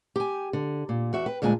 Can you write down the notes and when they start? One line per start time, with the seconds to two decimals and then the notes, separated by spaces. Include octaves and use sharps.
0.16 G4 G5 G#5
0.53 D3
0.89 A#2
1.13 E2 F#4 E5
1.26 B4 G5
1.42 D2 A#2 G#3 D4 G#5